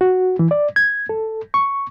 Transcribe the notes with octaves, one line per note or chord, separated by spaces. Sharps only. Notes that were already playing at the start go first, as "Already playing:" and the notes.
F#4
E3
D5
G#6
A4
C#6